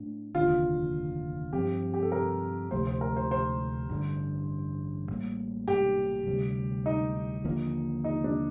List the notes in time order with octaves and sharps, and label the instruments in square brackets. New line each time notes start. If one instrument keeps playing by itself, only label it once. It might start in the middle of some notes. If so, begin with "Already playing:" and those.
Already playing: [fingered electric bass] A2 A3 D4
[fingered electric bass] F1 D#2 D3 [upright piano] F4
[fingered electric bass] G2 F3 C4 [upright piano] G4
[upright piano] G4
A4
A#4
[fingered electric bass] D2 C3 F3 A3 [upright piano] C5
[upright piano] C5
A#4
C5
C5
[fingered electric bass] A1 G2 D3
A1 A2 G3 A#3
[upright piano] G4
[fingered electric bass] D2 C3 G3
[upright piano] D#4
[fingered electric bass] D#2 D3 F3 A#3
[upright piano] D#4
D4